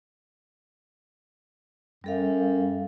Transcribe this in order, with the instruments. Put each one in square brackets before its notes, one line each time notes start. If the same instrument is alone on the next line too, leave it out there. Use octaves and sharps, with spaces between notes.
[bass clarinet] F#2 [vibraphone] G3 A4 F5